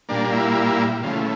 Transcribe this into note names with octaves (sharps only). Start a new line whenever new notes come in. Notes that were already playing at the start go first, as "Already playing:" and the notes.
A#2 G3 A#3 D4
E4
C#3 E3 A3 F4